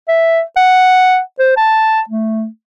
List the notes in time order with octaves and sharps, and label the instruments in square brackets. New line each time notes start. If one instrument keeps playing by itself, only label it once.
[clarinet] E5
F#5
C5
A5
A3